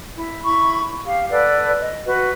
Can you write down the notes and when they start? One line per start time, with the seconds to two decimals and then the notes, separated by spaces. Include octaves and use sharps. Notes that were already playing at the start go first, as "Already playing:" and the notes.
0.17 E4
0.45 E4 B5 C#6
1.04 G4 F5
1.30 A4 B4 D5 F#5
1.80 D#5
2.06 F#4 B4